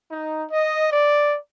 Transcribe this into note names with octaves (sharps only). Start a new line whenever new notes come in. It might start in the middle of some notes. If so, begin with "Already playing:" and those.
D#4
D#5
D5